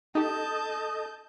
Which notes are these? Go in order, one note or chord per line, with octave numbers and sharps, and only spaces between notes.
D#4 G4 A4 D#5 A5 G6